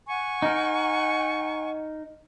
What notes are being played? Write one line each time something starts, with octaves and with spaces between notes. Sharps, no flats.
F#5 G#5 C#6
D#4 A#4